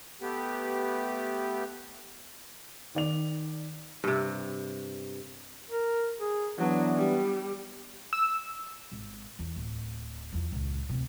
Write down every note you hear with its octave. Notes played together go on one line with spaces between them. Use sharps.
A3 B3 G4
D#3 D5 F7
G2 C3
A#4
G#4
E3 F#3 B3 D4
G3
E6
G#1
E2
D1
E2 F3
C#2 A#2
D2 C3